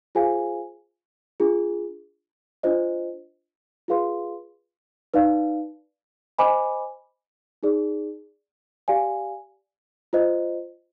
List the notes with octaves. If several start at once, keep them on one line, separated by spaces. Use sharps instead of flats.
F4 G#4 C5 F5 G#5
D4 F4 G#4
D4 F4 C5 D#5
F4 G#4 B4 F5 C6
D#4 B4 D5 F5
C5 D#5 G#5 B5 D6
D#4 G#4 D5
G4 D5 F5 G#5
F4 C5 D#5